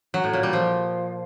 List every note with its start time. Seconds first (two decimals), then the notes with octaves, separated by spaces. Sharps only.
0.14 F#3
0.24 A2
0.33 A#2
0.43 G3
0.53 F3